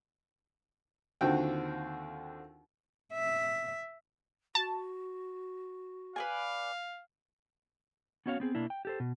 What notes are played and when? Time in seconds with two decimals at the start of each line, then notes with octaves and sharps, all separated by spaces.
1.21 D#2 D3 C4 F4 F#4 G5
3.13 E5
4.55 F#4 A5
6.16 B4 D5 F5 G#5
8.26 B3 C#4 F#4 C#5 D#5 F5
8.40 B3 C4 G#4
8.55 B2 A#3 D4 E4
8.70 G5
8.85 G4 A4 C5
9.00 B2